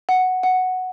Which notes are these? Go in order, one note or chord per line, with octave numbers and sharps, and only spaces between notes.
F#5
F#5